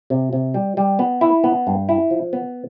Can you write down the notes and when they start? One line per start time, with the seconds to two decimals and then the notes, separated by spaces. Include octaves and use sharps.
0.10 C3
0.33 C3
0.54 G3
0.77 G3
0.99 B3
1.21 E4
1.44 B3
1.67 G2
1.89 E4
2.11 F3
2.33 B3